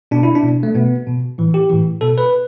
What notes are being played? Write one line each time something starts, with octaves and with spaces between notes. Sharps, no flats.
B2 D4
E4
D4
B2
A3
B2 B3
B2
A2 E3
G4
A2 E3
B2 A4
B4